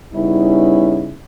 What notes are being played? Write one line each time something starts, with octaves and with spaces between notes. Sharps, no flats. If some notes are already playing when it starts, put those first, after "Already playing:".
C#3 G3 B3 C#4 D#4 E4